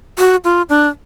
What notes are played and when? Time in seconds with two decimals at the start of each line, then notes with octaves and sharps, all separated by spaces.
0.18 F#4
0.44 F4
0.69 D4